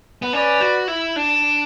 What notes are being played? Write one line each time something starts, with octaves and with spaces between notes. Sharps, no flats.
B3
C#4 B4 D5
F#4
E4
D4